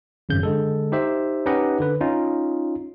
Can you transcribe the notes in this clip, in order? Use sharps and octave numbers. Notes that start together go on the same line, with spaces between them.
G#1 F#2 C#3 G6
D3 G#3 A4
D#4 G4 C5 E5
C#4 D#4 G4 B4 D#5 F#5
D3 B4
C#4 D#4 F4